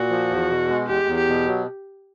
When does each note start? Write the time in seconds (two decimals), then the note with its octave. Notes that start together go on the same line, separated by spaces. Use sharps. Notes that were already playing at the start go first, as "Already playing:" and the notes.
Already playing: A#2 F#4
0.10 F3
0.31 E2
0.50 B2
0.68 G#3
0.88 E2 G4
1.07 E2
1.18 G4
1.28 B2
1.47 F#3